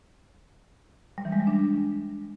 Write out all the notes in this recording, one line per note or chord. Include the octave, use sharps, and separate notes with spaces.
G3
E3
G#3
G3
D4